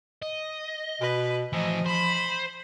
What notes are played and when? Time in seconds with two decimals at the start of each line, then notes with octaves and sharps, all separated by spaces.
0.22 D#5
1.01 B2 B4
1.53 A2 E3 F3 D#5
1.86 C5 B5